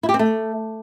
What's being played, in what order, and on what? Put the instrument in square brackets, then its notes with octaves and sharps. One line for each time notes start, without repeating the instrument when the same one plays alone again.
[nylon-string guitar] E4
G4
C4
A3